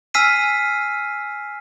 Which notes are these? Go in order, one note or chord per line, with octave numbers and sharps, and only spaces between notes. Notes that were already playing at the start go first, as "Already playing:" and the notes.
G#5 E6 F6 B6 C7 D#7